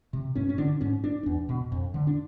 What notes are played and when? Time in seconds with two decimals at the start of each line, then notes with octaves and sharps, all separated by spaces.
0.13 C3
0.35 G2 C#4
0.49 C#4
0.58 D3 D4
0.81 G#2 C#4
1.04 D4
1.23 E2 D4
1.49 B2
1.72 F2
1.94 D3
2.07 D4